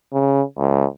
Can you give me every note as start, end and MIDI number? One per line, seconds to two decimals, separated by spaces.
0.13 0.42 49
0.58 0.86 37